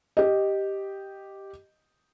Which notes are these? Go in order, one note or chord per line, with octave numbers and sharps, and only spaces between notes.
G4 D#5